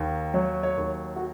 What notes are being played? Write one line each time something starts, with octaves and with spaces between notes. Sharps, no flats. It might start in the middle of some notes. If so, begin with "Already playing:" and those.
Already playing: D#2 D#3
F#3 C#5
C#5
D#2
F#4